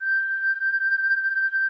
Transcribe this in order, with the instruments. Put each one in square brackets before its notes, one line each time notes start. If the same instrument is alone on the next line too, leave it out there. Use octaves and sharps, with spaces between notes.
[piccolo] G6